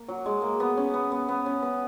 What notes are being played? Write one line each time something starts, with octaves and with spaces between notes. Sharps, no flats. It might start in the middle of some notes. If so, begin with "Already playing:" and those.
Already playing: A#3
F#3
G#3
A#3
B3
C#4
B3
B3
B3
C#4
B3